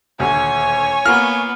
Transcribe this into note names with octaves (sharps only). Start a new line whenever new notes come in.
D#1 D2 F#4 C#5 G#5
A#3 B3 F4 F6